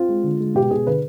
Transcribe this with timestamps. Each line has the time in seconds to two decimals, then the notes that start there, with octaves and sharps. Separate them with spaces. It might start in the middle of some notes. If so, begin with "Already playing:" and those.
Already playing: C4 F4
0.09 G#3
0.24 D3
0.40 G#3
0.55 B2 G4
0.71 B2 G#4
0.87 D3 B4